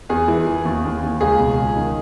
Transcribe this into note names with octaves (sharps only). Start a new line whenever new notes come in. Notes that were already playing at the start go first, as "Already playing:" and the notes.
E2 G#4
E3
E3
D#2
D#2
D#2
C#2 G#4
B2
C#2
D#3